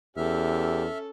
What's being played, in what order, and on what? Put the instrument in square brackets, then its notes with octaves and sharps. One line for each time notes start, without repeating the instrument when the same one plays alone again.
[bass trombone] E2 [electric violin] C#4 A4 [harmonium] G4 [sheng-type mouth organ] E5 F6